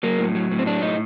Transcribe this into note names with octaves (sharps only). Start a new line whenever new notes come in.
F#3 A#3
A2
F#3
A2
C4
F#3 D4
A2 D#4